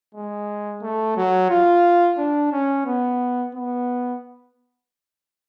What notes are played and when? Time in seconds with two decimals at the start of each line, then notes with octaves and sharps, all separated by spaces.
0.15 G#3
0.83 A3
1.17 F#3
1.50 F4
2.18 D4
2.52 C#4
2.86 B3
3.54 B3